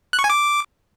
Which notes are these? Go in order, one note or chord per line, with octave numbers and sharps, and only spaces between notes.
F#6
C#6
G#5
D6